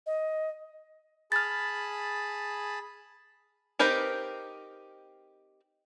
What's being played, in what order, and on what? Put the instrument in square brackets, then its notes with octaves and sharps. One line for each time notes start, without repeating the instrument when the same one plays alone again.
[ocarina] D#5
[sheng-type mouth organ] G#4 A5 B5 [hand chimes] F6 A6
[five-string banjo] C4 D#4 G4 A#4 B4